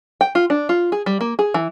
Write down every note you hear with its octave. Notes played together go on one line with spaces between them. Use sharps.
G5
F4
D4
F4
G#4
G3
A#3
G#4
E3